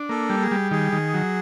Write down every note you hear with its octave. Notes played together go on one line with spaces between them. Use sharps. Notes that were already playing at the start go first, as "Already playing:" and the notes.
Already playing: D4
A#3 A4
G3
G#4
G3
D#3 G#4
D#3
F#3